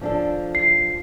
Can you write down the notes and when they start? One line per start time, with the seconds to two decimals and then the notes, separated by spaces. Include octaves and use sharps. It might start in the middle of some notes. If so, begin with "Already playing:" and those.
0.01 F3 D4 A4
0.55 C7